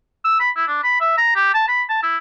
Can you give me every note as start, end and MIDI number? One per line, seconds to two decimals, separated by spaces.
0.25 0.40 88
0.40 0.50 83
0.57 0.65 64
0.68 0.80 62
0.84 0.97 83
1.01 1.17 76
1.18 1.33 82
1.36 1.52 67
1.54 1.67 81
1.68 1.83 83
1.89 1.98 81
2.03 2.17 64